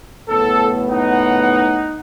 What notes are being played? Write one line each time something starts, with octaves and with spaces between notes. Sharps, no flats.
F#1 A2 B3 A4
D#4 F#5